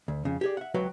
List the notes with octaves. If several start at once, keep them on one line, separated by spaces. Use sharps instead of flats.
D2
F2 C#3
G4 G#4 D5
E5 F#5
C#2 F#3 F#4 B4 C#5 G5